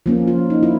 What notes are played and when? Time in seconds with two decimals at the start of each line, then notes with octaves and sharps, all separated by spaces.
0.06 F3 A#3 C#4
0.28 F4
0.50 D#4
0.63 E4